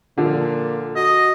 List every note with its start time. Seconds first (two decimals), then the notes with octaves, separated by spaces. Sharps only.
0.18 A#2 D3 F3
0.96 F#4 D#5